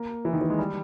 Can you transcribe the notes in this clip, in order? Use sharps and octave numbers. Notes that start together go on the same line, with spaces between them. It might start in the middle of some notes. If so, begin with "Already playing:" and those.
Already playing: A#3
E3
D#3
E3
G#3
G3